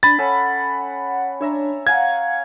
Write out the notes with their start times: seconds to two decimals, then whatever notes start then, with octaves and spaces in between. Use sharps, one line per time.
0.03 D4 B5 A6
0.19 C#4 A4 F#5 G#5
1.41 D4 C#5 E5 A#5
1.87 F5 F#5 G#5 A#5 G#6